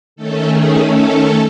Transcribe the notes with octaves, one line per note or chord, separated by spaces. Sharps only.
D#3 A3 C#4 A4
G#4
A4